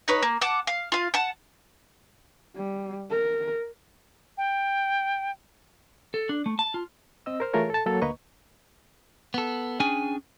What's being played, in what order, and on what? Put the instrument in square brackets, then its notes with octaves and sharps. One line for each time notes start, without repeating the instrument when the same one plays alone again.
[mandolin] D#4 B4 C#5
A#3
F#5 A5 D6
F5
F4 F5
F#5 A5
[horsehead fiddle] G3
A#4
[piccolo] G5
[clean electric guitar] A4
D4
A3
A5
F4
[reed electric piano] C4 D#5 E6
A#4 C5 F6
E3 A3 F4 G#4 A#4 C#5
A4 A5
F#3 A#3 A4 C#5
D2 A#3 B4 D#5 A#5 C#6
[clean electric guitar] B3 A4
C#4 D4 G#4 G5 G#5